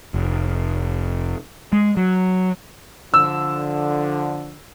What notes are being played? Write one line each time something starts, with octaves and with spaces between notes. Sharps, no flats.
F1
G#3
F#3
D3 F3 E6